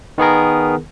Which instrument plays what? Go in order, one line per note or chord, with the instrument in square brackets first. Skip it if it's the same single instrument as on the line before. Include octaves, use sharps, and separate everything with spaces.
[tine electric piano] D#3 B3 G#4 A#4